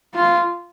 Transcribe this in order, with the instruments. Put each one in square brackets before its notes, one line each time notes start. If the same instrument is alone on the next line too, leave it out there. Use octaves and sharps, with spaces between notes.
[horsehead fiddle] F4